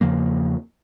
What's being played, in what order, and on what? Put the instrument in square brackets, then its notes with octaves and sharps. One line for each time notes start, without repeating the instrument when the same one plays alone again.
[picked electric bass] E2 C#3 F3 A#3